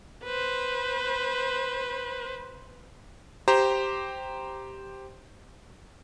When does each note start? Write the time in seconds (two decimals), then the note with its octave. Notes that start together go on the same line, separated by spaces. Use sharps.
0.24 B4 C5
3.48 G4 C5 A#5